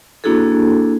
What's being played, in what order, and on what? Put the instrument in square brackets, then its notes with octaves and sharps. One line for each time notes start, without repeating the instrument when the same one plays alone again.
[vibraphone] A#3 D4 E4 F#4 G#4 A4